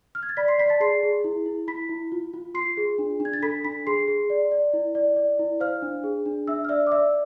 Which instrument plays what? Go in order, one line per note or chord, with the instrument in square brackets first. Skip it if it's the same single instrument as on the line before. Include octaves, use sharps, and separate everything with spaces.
[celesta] F6
G#6
A6
D5 B5 B6
C6 C7
D5 B5 B6
A5 A6
G#4 C6 C7
G#4
E4
E4
E4 B5 B6
E4
F4
F4
F4 C6 C7
G#4
D4
D4
G#6
A6
A4 B5 B6
D4 B5 B6
G#4 C6 C7
G#4
D5
D5
E4
D5
D5
E4
C5 F5 F6
D4
G#4
D4
D4 E5 E6
F6
D5 E5 E6
D6
D5 E5 E6